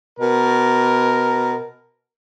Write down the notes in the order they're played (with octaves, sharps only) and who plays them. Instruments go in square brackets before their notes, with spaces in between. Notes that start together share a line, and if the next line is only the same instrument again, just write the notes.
[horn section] B2 A#4